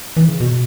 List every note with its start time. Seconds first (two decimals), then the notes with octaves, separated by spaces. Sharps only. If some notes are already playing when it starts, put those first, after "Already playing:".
0.17 E3
0.28 C#3
0.40 B2